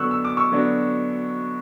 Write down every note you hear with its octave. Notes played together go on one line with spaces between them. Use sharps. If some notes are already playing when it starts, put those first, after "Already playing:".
Already playing: D3 F#3 B3 D4 C#6 E6 F#6
E6
D6
C#6 E6
D3 F#3 B3 D4